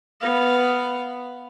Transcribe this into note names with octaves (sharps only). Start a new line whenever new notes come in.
B3 F5